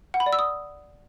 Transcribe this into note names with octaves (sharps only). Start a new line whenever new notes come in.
F#5
B5
D5
E6
D#6